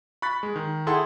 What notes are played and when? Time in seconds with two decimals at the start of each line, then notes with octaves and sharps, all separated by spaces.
0.22 B5 C#6 F#6 A6 B6
0.43 G#3
0.56 D#3
0.87 E4 G#4 A4 F#5 G5 C6